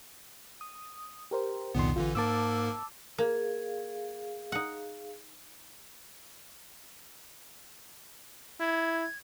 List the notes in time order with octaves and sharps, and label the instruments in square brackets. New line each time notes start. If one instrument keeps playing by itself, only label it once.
[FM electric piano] D#6
G4 A#4 C5
[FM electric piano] C2 D#3 C6 [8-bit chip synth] F2 A#2 B3
[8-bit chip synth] A1 D3 E3 [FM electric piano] F4
[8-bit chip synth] G#2 A#3 A#4 [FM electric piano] A5 D6 E6
[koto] A#3 [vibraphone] G#4 F5
[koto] D#4 F#5
[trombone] E4 [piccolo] G#6